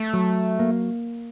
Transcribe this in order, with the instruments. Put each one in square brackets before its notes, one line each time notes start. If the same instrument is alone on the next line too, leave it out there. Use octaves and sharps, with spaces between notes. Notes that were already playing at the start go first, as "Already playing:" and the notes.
Already playing: [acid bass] A3
[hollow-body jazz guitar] F#3
A#3